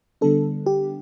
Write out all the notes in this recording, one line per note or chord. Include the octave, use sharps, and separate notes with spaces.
D3 G3 B3 D4 A4
G4